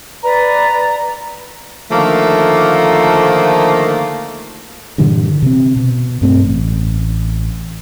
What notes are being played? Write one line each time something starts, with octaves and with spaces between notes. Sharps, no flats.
B4 D5 A#5
D3 D#3 F3 A3 A#3
G2 A#2 D3 E3
C3 C4
B2
G2 A3 C4
A1